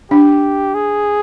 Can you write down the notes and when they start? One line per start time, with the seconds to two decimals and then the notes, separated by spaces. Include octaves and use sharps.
0.11 D4 G4
0.74 G#4